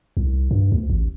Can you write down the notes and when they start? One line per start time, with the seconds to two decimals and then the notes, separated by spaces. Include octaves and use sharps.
0.17 C2
0.51 G2
0.72 D2
0.90 A1